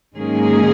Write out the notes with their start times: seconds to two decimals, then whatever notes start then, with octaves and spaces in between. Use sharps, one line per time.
0.16 G#2 D#3 F#3 G#3 A#3 C#4 G#4